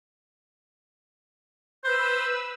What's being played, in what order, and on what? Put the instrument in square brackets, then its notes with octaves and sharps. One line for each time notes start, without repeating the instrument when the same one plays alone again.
[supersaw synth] B4 E6 [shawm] C5 [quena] G6